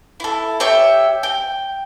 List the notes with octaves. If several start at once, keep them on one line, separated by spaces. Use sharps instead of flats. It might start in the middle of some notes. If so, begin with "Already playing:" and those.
E4 A4
G4 C#5 E5 G5
G5